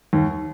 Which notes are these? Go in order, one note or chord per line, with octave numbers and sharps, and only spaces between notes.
D#2